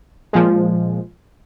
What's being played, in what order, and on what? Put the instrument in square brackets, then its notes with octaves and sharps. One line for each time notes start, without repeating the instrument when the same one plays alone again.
[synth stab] A#2 F3 G#3